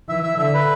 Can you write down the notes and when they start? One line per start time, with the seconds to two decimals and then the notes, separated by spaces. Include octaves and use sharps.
0.09 E3 E5
0.23 E5
0.38 D3 E5
0.54 B4